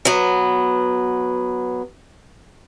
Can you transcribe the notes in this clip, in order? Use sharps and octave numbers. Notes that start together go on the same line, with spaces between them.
F#3 B3